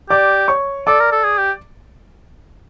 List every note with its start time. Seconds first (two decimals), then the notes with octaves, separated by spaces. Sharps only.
0.10 G4 D5 D6
0.48 C#5 C#6
0.87 A4 D5 D6
1.00 A#4
1.12 A4
1.25 G#4
1.38 G4